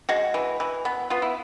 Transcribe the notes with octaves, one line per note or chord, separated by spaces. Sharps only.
G#3 F#4
E3
E3
B3
B3 F4
E4